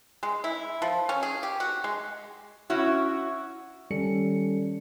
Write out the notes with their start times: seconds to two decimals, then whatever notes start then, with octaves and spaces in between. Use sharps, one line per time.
0.23 G#3
0.44 E4
0.82 F3
1.09 C#4
1.23 G#4
1.43 G4
1.60 F#4
1.84 G#3
2.70 C#4 E4 F#4
3.91 D#3 G3 C#4 A4 C#7